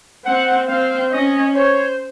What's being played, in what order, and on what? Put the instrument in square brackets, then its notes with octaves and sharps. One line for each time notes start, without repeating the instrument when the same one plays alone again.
[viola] C4 [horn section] F#5
[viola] C4 [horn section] F5
[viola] C#4 [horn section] D#5
[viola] C5 [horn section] C#5